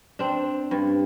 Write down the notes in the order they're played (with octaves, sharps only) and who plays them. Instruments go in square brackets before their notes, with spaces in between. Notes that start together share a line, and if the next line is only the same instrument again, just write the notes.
[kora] C4 D4
G2